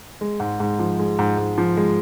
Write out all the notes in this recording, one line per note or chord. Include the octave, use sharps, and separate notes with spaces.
G#3
G#2
G#2
F3
G#3
G#2
G#2
F3
G#3